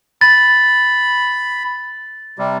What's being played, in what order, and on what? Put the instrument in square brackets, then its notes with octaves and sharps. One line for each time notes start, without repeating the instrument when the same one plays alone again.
[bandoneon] B5 [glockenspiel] A6
[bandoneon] C3 G3